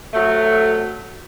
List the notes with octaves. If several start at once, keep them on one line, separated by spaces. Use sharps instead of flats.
C3 F#3 A3